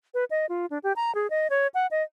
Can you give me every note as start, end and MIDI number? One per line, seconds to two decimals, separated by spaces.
0.14 0.25 71
0.30 0.46 75
0.49 0.66 65
0.71 0.78 62
0.83 0.93 67
0.96 1.14 82
1.15 1.30 68
1.30 1.47 75
1.50 1.67 73
1.74 1.87 78
1.91 2.03 75